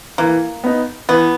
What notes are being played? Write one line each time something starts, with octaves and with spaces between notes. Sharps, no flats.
E3 A#3
B3 D#4
E3 B3